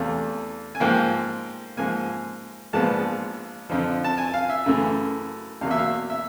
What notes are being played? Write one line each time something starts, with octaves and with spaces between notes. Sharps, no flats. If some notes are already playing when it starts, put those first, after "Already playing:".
Already playing: E2 C3 E3 A3 F5
G#5
G#2 F3 A#3 G5
G#2 F3 A#3 G#5
A#1 G#2 F3 G#3 B3 A5
F2 D3 F3
A5
G#5
F5
E5
F#2 C#3 E3 A3
E2 B2 F#3 A#3 F5
E5
F5
E5